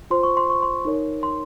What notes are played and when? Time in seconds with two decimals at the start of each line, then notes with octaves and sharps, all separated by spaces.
0.10 F4 C5 C6
0.23 C#6
0.37 C6
0.50 C#6
0.62 C6
0.85 D#4 A#4 C#5
1.23 C6